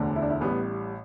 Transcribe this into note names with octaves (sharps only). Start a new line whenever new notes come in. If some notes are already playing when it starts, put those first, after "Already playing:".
Already playing: E1 D2 D3
E4
D4
E4
A1 A2 G3 B3